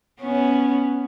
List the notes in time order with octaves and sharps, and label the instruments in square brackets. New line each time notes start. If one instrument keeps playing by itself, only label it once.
[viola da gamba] B3 C#4